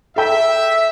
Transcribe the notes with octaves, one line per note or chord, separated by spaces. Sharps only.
A4 E5 G5